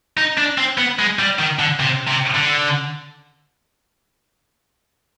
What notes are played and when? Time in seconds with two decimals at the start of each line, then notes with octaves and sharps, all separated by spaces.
0.17 D#4
0.37 D4
0.58 C4
0.78 B3
0.99 G#3
1.19 G3
1.39 D#3
1.59 D3
1.80 C3
2.07 C3
2.34 D3